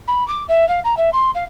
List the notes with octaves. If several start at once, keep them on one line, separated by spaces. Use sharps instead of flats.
B5
D6
E5
F5
A#5
E5
C6
F5